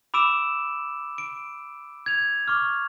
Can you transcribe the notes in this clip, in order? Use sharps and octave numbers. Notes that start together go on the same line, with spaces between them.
B5 D6 E6 D7 E7
D7
G#6 F7
C#6 D6 F6